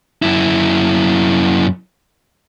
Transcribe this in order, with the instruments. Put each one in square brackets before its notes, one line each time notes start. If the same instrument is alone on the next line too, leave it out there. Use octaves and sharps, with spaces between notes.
[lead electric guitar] F#2 E4